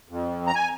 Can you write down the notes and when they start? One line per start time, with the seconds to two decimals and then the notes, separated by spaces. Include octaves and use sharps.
0.09 F2
0.47 A#5
0.55 G#5